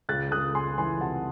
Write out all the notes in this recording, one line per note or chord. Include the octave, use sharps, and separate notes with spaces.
C#2 F#6 A6
C#2 D#6 F#6
C#2 G#5 C6
E3 G#5 C6
C3 F#5 A5